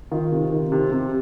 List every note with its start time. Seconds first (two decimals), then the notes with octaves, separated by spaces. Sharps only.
0.11 D#3 F4
0.32 C3
0.52 D#3
0.72 C3
0.91 C3